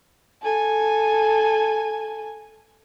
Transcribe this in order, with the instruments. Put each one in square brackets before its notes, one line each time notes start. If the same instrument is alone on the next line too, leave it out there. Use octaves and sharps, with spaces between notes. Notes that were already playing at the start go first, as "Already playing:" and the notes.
[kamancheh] A4 G#5